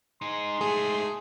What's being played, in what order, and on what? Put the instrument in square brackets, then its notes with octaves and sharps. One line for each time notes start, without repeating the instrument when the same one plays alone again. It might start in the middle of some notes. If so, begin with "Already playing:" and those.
[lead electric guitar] D#4 G#4 [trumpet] C6
[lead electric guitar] G#2 A3 [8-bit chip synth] G#4